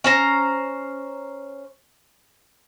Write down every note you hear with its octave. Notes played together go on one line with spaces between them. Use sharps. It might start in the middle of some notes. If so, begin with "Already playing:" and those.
C#4 C5 A#5